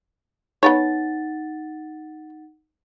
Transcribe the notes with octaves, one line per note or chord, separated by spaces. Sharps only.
B3 D#4 B4 C#5 F#5 A6